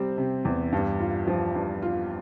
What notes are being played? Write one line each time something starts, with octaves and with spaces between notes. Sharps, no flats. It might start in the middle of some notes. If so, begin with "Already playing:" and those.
Already playing: C3 G3 C4
C3
E2
G2
F4
F3
G2
F4